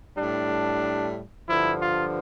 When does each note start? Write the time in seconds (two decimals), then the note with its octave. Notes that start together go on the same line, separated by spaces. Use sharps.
0.16 A2 G3 D4
1.48 G2 D3 F3 E4
1.82 F4